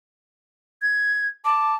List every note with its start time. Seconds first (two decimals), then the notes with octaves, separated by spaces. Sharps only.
0.82 G#6
1.45 A5 D6